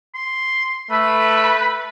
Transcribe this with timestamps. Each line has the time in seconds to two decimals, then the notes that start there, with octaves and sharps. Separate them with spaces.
0.14 C6
0.91 A3 B4 B5